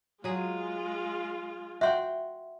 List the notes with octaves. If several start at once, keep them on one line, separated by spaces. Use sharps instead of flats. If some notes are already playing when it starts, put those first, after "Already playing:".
F#3 G#3 F4 G#4
F#4 E5 F#5 G5 C6